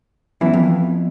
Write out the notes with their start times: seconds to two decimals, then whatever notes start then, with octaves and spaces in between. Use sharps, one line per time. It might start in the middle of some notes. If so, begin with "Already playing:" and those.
0.41 F#2 E3 B3 E4
0.54 F2